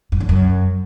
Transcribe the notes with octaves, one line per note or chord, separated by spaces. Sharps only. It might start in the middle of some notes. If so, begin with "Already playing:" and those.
G2
D3
F#2